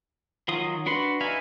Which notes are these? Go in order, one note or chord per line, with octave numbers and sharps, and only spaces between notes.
D#3 F#3 F4 D#6
D4 F#4 B4 C6
D#4 E4 B4 F5 G#5